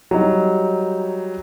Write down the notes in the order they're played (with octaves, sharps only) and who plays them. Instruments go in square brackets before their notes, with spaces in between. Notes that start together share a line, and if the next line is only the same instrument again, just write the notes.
[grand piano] F#3 G3 D#4